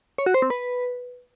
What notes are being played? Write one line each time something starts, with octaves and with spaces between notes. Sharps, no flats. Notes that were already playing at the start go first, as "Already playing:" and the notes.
C#5
F#4
C5
C4
B4